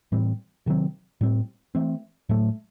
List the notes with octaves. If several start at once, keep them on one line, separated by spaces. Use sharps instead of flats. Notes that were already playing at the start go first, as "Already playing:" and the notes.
A2 E3 G3 C4
C3 D#3 F#3 C4
A2 G3 C4
E3 A3 C4
A2 F#3 A3